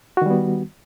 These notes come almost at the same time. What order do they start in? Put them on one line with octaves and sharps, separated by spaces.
F#4 D#3 G3 B3